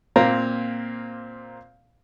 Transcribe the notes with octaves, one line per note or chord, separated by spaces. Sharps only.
A#2 A#3 C4 A#5